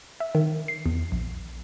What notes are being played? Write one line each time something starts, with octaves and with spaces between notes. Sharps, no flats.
E5
D#3
C7
E2
A#1